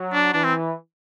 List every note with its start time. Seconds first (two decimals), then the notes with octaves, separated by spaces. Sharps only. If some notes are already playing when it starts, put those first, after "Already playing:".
Already playing: F#3
0.13 D4
0.34 E3 D4
0.44 C4